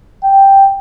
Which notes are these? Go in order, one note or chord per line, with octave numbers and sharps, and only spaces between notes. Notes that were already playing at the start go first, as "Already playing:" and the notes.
G5